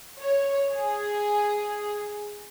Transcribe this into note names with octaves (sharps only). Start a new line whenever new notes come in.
C#5
G#4